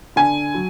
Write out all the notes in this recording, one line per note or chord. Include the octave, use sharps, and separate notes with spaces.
D3 G#5
F#3